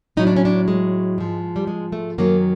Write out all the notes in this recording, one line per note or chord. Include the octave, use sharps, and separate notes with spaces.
A2 F#3 D#4
D4
C#4
D4
G#3
G#2 F3
G3
G#3
A3
F#2 D#3 F#3 A#3